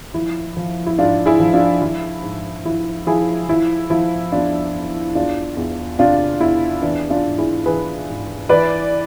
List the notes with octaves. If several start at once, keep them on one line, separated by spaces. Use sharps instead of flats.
F3 E4
F3
E4
G#2 D4 F4
E4 G#4
F3
D4 F4
F3 E4
G#2
F3 E4
F3 E4 G#4
F3 E4
F3 E4
E2 D4 F4
E2
E2 D4 F4
E2
C3 D4 F4
E2 E4
E3 D4
D4 F4
G#2
E4 G#4
E3 G#4 B4
G#2
E3 B4 D5